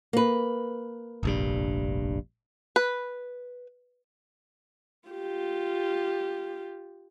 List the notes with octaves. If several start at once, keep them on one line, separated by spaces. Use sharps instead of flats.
A#3 B4
F1 A#1 G2
B4
F4 G4